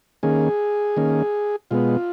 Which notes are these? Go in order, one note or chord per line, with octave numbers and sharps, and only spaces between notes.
D#3 A#3 C#4 G#4
D#3 A#3 C#4
B2 G#3 B3 F4